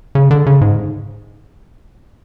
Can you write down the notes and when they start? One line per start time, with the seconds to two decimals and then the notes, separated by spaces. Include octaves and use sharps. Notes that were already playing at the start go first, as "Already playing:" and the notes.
0.15 C#3
0.31 D3
0.46 C#3
0.61 G#2